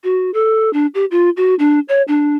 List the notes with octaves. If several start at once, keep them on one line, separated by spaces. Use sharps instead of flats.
F#4
A4
D4
G4
F4
F#4
D4
C#5
D4